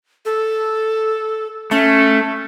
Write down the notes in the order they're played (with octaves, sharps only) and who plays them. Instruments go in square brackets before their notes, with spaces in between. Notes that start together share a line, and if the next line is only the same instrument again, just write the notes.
[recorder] A4
[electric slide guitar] A3 [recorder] C#4